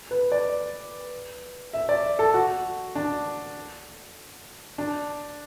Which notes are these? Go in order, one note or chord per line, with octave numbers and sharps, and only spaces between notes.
B4
D5
E5
D5
A4
F#4
D4
D4